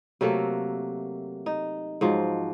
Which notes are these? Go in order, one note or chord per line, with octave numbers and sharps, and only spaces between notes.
C3 F#3 A3 A#3
D#4
G#2 F3 F#3